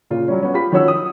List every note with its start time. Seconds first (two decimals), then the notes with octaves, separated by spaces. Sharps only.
0.10 A#2 C#3 F4
0.28 F#3 G3 C#4
0.43 B3 C#4
0.54 F4 G4 B5 B6
0.72 D#3 F3 C#4 F#4 C#5 E6
0.88 D#6